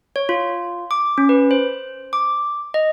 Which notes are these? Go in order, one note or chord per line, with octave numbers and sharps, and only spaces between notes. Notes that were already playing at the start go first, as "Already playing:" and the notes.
C#5
F4
D6
C#4
B4
C5
D6
D#5